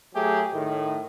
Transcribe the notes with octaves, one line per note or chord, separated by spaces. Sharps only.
F#3 A3 G4 G#4
A2 D#3